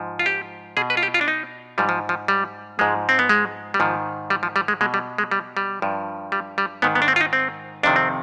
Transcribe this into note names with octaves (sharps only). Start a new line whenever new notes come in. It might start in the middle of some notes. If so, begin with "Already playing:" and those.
Already playing: G#2 F3
F4
G4
B2 G#4
B4
F4
G4
F4
D4
D#4
G#2 F3 G3
F3
F3
G3
G#2 F3 G#3
C4
B3
G#3
G3
G#2 D#3 F3
G3
F3
G3
G#3
B2 G#3
G3
G#3
G3
G3
G2 F3
G3
G3
G#2 D#3 B3
B3
D4
C4
F4
D#4
C4
F2 C3 D#3 D4
C4